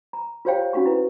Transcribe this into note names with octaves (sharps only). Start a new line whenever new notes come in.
A#5
F4 G4 C5 C#5 F5 G5
C#4 D#4 F#4 F#5 C#6
E4 B4